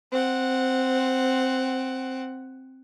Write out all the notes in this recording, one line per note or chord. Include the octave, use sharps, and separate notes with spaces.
C4 F#5